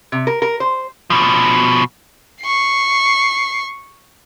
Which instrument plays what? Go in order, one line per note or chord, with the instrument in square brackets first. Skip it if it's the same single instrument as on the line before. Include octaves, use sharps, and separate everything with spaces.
[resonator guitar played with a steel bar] C3
A#4
A#4
C5
[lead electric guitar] B2 F3
[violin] C#6 C7